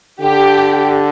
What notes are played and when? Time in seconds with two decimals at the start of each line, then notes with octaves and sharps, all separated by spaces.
0.21 D3 G4